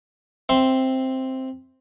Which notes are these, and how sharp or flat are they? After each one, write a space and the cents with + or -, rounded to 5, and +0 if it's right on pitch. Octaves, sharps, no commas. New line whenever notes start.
C4 +0 E5 +0 C6 +0